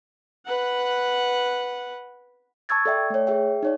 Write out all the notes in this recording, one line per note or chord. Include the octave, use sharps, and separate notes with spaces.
B4 F#5
A5 C#6 E6 G#6 A6
A4 D5 E5 G5
A3 C#5
G#4 E5 G5
D#4 C#5 D5